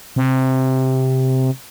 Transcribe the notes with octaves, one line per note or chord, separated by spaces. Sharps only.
C3